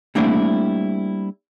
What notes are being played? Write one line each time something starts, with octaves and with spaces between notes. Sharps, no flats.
G3 A3 A#3 C4 D4 E4